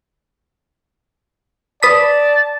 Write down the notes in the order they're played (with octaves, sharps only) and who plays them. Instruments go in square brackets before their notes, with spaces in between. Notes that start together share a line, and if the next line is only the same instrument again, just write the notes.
[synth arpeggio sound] B4 D#6 B6 [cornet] D5 [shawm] A5